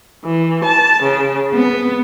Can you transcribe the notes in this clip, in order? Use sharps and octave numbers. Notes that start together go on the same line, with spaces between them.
E3
A5
C#3
B3